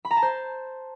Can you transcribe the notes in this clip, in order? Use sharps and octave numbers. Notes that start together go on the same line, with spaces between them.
B5
A#5
A5
C5